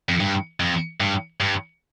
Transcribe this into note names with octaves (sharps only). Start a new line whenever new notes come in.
F2
G2
F2
G2
G2